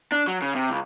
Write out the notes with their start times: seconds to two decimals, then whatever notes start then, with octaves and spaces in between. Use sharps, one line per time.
0.12 D4
0.27 F#3
0.42 C#3
0.56 C3
0.70 C#2